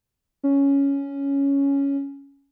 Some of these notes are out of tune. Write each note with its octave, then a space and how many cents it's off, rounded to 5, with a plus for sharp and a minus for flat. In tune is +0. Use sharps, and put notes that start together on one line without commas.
C#4 +5